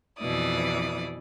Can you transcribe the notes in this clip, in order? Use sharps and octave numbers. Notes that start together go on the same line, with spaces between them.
F2 B2 E3 E4 D5 D#6